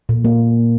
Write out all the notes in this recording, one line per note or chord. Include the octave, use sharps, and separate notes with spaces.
A#2
A#3